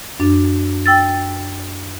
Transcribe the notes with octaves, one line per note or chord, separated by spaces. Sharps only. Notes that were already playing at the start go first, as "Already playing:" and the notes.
F#2 D4
G5 E6 A6